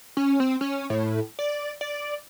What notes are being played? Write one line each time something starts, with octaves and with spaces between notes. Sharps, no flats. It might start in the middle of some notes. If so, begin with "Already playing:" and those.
C#4
C4
C#4
A2
D5
D5